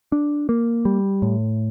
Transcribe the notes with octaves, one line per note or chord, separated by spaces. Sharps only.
D4
A#3
G3
A2